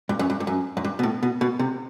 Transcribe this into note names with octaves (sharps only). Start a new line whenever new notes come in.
G2
F#2
G2
G2
F#2
F#2
G2
B2
A2
B2
B2
C3